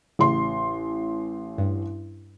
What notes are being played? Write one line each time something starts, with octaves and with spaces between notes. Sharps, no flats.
A1 C#3 C6
G2